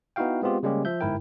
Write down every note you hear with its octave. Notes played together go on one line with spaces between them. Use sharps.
B3 D#4 E4 F#4 F5 G5
G#3 B3 C4 F4 G4
C#3 G3 G#3 A#3 C#4 G4
F3 E5 G6
G1 G#2 E4 A#4 G5